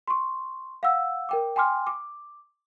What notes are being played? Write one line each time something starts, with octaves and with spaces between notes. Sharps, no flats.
C6 C#6
F5 F#5 E6
A#4 G5 D6
G5 G#5 C6 D6 F6
D6